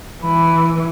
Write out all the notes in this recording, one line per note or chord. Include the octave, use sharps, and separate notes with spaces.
E3 B5